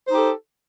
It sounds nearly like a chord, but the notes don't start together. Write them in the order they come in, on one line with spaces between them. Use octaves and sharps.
C5 D#4 G4 A4